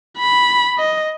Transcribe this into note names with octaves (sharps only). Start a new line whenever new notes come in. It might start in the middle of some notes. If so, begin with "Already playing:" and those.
B5
D#5